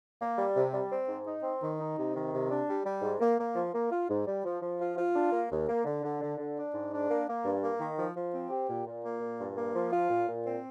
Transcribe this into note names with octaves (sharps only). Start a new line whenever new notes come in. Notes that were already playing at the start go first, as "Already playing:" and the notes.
A#3
G3
C3
G3
C4
G#2
D#4
C4
D#3
D#4
C3
D#3
C3
D4
G3
G3
G#2
A#3
A#3
F3
A#3
F4
G#2
G3
F3
F3
F4
F4
D4
A#3
D#2
A#3
D3
D3
D3
D3
D4
G#2
D4
A#3
A#3
G2
A#3
D#3
F3
F3
C4
G4
A#2
A#2
A#3
A#2
G2
A#3
F3
F4
A#2
A#2
C4